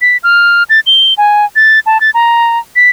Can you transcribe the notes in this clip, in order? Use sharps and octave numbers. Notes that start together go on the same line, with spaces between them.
B6
F6
A6
G7
G#5
A6
A5
A6
A#5
B6